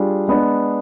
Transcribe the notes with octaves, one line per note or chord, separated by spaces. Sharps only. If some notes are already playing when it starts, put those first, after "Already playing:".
Already playing: G3 D4 F4 G#4
G#3 B3 D4